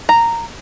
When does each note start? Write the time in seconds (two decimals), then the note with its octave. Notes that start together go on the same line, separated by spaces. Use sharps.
0.09 A#5